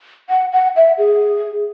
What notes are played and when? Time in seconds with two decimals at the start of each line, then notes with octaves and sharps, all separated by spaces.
0.30 F#5
0.52 F#5
0.76 E5
0.98 G#4